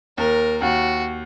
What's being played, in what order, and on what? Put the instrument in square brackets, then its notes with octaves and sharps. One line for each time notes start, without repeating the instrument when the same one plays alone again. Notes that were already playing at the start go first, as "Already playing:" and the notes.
[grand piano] D#2 [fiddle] A#4
[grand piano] D#2 [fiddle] F#4